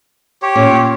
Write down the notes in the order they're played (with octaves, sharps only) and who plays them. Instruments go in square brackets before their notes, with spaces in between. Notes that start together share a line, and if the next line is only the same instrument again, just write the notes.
[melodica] G4 C#5
[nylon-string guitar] A#2 C#4